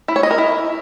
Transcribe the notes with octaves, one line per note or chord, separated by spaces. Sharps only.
E4
C#5
D#5
A#4
E4